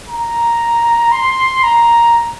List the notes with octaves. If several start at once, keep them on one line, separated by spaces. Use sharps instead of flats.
A#5
C6
A#5